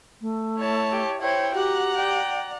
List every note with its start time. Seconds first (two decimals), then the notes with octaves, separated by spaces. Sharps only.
0.21 A3
0.58 E4 C#5 A5
0.92 G4
1.21 E4 C5 C#5 G5
1.55 F#4 G4 F#5 A#5
1.96 D5 G5